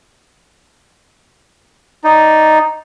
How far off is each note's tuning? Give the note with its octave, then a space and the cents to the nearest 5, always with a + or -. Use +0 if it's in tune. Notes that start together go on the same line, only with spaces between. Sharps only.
D#4 +0 D5 +0